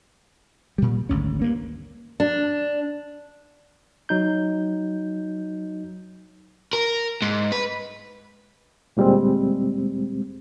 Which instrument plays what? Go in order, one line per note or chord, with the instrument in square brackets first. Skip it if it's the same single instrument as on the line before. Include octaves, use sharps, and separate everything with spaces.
[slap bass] A#2 G3
G#1 D2 C#4
G2 A#3 C#4
[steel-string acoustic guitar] D4
[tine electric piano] F#3 D#4 G6
[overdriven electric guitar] A#4
G#2
B4
[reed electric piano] D2 A#2 G3 G#3 C4